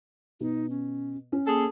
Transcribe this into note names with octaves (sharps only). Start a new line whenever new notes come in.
B2 D#4
C#4
C#4
A#3 G#4 A4